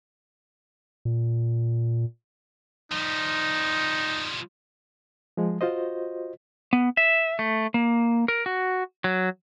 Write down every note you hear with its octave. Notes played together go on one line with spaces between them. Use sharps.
A#2
F3 G3 D#4
F3 G#3
F4 F#4 C5 D#5
B3
E5
A3
A#3
A#4
F#4
F#3